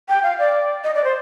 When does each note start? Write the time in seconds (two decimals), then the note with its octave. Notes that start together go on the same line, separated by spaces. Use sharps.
0.09 G5
0.23 F5
0.39 D5
0.84 D#5
0.95 D5
1.04 C5